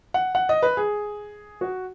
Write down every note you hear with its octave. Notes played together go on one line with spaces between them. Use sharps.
F#5
F#5
D#5
B4
G#4
F#4